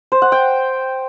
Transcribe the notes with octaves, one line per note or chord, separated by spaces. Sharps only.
C5
F#5
G5